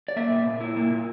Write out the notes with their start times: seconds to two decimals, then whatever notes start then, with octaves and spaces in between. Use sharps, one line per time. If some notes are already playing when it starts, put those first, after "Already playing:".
0.08 D5
0.16 A#3 E5
0.30 A#2
0.46 A#2
0.61 E4
0.76 A#3
0.90 A#2